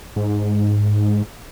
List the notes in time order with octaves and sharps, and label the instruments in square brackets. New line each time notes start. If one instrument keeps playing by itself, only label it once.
[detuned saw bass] G#2